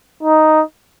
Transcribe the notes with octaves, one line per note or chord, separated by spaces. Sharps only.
D#4